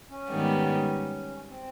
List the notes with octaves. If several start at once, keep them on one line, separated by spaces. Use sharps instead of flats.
C#4
G#2 D#3 G3 B3
C4